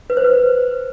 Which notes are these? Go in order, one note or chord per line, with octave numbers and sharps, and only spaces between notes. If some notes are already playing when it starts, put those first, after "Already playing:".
B4
C5
B4